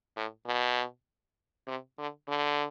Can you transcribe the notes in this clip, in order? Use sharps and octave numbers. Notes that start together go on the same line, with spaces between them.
A2
B2
C3
D3
D3